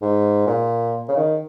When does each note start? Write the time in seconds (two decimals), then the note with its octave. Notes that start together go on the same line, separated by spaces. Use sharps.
0.02 G#2
0.47 A#2
1.09 C#3
1.17 D#3